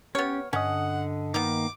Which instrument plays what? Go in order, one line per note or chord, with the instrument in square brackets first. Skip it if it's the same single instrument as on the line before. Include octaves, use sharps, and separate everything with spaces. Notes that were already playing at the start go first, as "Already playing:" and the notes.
[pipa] B3 C#5 [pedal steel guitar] C#4 [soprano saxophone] G4 [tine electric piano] F6
[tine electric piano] G2 D#5 [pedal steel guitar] D3 D#6 [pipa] C#4 [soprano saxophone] F#5
[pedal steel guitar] D#3 A#3 [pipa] B3 D#4 [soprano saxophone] D6